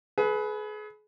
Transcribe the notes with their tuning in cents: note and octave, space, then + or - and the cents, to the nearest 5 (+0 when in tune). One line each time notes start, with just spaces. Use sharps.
G#4 +35 B4 +0